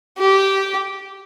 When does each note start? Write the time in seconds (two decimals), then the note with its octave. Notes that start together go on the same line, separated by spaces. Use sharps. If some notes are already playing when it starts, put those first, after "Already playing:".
0.18 G4